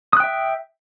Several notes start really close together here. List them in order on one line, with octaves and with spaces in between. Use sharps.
D#6 F#6 G5 E5